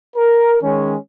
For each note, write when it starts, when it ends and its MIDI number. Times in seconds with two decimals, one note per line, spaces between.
0.17 0.56 70
0.62 0.96 51
0.62 0.96 56
0.62 0.96 61